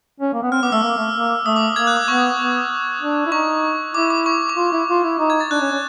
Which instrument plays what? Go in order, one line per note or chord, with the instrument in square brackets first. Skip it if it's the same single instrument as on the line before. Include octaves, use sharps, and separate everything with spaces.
[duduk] C#4
A#3
B3
[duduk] C4 [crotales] F6
[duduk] B3 [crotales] D6
[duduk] A3 [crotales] E6
[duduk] A#3
A3
A#3
[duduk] A3 [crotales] D#6
[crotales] D6
[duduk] A#3 [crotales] G#6
[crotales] F#6
D6
[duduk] B3 [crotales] C#6
[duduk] B3
D4
E4
[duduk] D#4 [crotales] C#6
[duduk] E4 [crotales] D6
[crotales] D6
C#6
C#6
[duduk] F4
E4
F4
E4
D#4
[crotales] G#6
A6
[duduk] D4 [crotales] F#6
[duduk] C#4
C#4